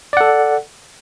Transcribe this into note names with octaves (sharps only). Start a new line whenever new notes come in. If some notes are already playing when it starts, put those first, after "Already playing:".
A4 D5 F#5